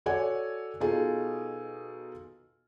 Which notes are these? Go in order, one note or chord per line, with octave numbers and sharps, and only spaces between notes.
F#4 A4 C#5 D5 F#5 G#5
B2 D#4 F4 G#4 A4